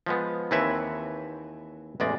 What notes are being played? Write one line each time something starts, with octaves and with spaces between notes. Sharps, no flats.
F3 G#3 B3
D#2 E3 C4 B4 C#5 E5
A1 E2 G#3 D5